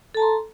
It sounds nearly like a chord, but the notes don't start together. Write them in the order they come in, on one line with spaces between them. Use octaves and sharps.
A4 A5 A#5 C6